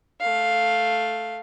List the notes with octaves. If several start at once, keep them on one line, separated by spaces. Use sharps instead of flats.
A3 F5